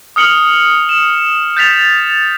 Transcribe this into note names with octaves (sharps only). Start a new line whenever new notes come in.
D#6 F6 C#7 F#7
E7
G6 A6 B6 F7